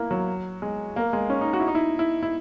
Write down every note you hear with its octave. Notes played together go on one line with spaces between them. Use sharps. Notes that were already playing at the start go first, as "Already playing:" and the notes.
Already playing: A#3 E4
F#3
G#3
A#3
G#3
C#4
D#4
F#4
E4
D#4
E4
E4
E4